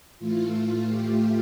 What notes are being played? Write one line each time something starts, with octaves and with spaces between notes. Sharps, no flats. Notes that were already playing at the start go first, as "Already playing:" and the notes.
A2 E3 A3 F4
G4